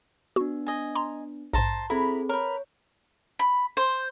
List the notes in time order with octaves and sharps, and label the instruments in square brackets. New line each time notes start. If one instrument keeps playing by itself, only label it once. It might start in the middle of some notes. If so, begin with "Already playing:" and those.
[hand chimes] B3 D4 [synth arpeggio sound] F#4
[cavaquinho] D#5 G#5
[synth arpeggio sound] A#5 C6
[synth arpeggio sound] A#1 G#2 [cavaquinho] C5 A5 A#5
[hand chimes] C4 G#4 A4 [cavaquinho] E4 A#5 B5
[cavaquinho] A#4 B4 [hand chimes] C#5
[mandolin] B5
C5